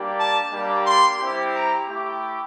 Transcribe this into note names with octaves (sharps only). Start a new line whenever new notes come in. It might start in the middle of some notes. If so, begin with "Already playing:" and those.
Already playing: G3 A#3 D4 G4
A5
G3 A#3 D4 G4
C6
G3 C4 E4 G4
A#5
A3 E4 G4